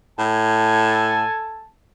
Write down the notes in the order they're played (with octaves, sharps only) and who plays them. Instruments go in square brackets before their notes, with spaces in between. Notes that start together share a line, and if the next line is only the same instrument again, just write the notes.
[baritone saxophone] A2 [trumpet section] A4 G#5 A5